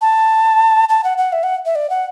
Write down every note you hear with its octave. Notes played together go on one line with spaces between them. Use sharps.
A5
A5
F#5
F#5
E5
F#5
E5
D5
F#5